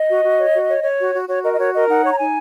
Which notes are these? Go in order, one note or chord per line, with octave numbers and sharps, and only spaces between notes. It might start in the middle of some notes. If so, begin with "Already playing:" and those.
Already playing: D#5
F#4
F#4
C#5
F#4
C#5
C#5
F#4
F#4
F#4 C#5
A#4 D#5
D#5
F#4 C#5
A#4 D#5
D#4 F#5
C#5 C#6
A#5
D#4 G#5